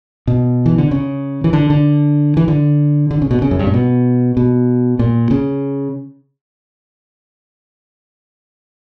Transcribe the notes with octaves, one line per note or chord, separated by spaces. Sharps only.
B2
E3
D3
C#3
E3
D3
D3
E3
D3
D3
C#3
B2
C#3
F#2
G2
A#2
B2
B2
A#2
C#3